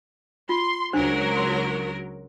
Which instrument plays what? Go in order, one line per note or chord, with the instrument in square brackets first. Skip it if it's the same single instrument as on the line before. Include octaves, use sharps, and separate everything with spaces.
[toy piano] F4 [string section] C6
[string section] C#2 F#3 A#4 [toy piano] D4 C5
[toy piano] C6